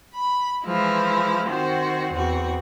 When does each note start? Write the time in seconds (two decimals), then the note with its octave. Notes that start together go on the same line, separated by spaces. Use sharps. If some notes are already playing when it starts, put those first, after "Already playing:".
0.14 B5
0.64 E3 F3 G#3 E4
1.46 D#3 C4 F#4 C5
2.12 E2 C4 F#4